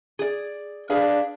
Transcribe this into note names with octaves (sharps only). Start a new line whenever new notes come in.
G#4 D5
D4 G#4 B4 F5